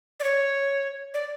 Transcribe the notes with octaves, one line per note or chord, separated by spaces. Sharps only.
D5
C#5
D5